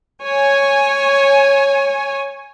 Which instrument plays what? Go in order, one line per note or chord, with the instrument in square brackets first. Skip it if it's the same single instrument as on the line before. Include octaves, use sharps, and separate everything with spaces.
[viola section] C#5 G#5